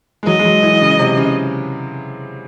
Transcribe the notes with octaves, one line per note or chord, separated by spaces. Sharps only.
G#3
F#3 D#5
G#3
F#3
E3
C#3
C3
C#3